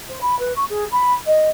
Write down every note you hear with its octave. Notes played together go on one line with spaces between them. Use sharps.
C5
B5
B4
C#6
G#4
B5
D#5